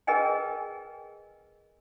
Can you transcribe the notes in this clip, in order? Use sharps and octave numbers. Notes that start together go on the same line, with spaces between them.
G#4 A#4 B4 D#5 G5 G#5